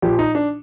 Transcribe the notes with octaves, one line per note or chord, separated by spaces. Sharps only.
A#1 A#2 F3 G4
D#4
D4